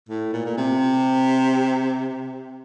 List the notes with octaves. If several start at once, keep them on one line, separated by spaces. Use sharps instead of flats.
A2
A#2
A#2
C3